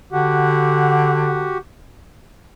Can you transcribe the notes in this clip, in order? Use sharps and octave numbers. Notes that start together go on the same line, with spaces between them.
D3 F#4 G4 F#5